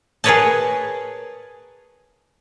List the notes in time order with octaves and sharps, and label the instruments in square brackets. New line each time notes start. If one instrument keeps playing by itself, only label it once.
[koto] G#4 A#4 B4 C#5 D#5 A5